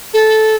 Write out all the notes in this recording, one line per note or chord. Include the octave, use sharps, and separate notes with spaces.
A4